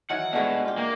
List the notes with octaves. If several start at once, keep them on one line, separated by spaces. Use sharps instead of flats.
D#3 E3 F#3 F#5
B2 G#3 A3 D4
F4 G4
A#3